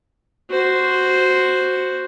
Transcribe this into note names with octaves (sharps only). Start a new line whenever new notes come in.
F#4 C5